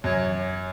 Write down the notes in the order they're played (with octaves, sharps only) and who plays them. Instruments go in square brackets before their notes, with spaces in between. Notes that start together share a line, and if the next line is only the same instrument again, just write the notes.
[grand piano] F#2 [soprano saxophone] C#5